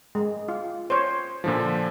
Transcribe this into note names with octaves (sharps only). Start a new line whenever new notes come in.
G#3
F4
C5 C#5
A#2 D3 F3